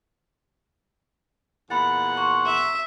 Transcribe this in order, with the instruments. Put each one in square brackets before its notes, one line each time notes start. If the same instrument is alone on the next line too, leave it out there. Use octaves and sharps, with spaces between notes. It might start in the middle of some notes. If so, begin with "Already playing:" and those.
[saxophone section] E2 A#2 F#5 [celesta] B5 A6
[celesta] A#5 C6 C#6
[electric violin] E5